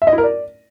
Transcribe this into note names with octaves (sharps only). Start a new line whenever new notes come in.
E5
D#5
E4
A#4
D5